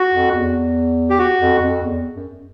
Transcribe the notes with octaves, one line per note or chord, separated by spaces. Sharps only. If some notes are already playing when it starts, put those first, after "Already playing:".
Already playing: F#4
F2
E2
G4
F#4
F2
F2
E2
F#2